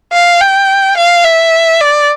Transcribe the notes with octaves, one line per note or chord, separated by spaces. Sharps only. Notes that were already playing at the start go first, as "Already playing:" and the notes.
F5
G5
F5
E5
D5